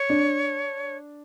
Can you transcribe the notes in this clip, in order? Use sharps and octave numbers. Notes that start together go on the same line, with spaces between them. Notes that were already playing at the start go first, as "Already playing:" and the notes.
Already playing: C#5
D4